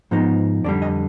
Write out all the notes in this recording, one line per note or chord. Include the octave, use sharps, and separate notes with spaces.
G#2 F3 B3 D#4
F2 D3 G3 D5
D#5